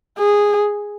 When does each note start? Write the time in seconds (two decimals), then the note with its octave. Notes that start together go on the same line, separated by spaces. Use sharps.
0.19 G#4